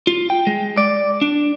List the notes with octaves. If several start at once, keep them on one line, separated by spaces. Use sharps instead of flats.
F4
G5
G#3
D5
D4